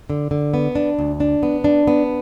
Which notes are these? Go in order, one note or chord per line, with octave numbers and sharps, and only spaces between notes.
D3
D3
B3
D4
D2
D4
B3
D4
B3